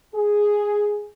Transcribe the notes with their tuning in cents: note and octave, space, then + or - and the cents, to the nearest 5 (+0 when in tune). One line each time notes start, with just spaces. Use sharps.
G#4 +0